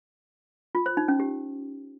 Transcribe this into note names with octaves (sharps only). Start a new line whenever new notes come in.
F4
C5
D#4
C#4
G4